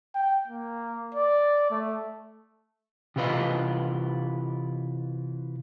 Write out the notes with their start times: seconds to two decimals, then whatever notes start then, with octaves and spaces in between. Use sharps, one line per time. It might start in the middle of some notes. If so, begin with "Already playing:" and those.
0.15 G5
0.48 A#3
1.15 D5
1.71 A3
3.16 C3 E3 F4 B4 D#5 F5